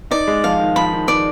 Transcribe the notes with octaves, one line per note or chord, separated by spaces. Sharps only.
D#4 D5
G#3
F3 F5
D#3
F3 B5
D#3
D#3 D5